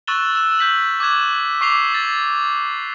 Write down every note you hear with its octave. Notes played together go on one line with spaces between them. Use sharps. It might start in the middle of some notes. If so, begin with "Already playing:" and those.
C#6 E6 F#6 A6 E7 G7
E6 E7
G6 B6 F#7
D6 F#6 G#6 E7
C#6 D6 C7 F7 G7
A6